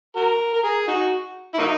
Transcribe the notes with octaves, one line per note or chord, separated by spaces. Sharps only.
F#4 A#4
A#4
G#4
D#4 F#4
E4
F#3 A#3 D#4